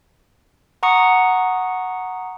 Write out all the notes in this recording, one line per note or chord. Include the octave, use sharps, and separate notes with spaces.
F#5 A#5 C#6 D#6 C#7